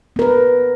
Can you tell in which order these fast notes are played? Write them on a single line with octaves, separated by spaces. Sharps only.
B3 A#4 B4